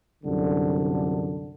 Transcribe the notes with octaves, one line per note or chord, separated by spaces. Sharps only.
C2 F#2 D3